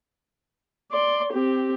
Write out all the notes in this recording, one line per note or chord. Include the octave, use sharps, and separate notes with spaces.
D5 C6
C4 G4